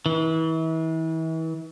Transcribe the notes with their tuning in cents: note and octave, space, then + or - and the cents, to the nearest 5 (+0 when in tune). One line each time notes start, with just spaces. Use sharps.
E3 -35